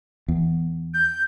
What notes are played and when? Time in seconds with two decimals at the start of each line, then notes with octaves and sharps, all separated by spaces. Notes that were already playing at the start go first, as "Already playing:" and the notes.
0.28 E2
0.94 G6